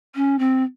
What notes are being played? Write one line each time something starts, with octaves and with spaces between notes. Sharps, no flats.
C#4
C4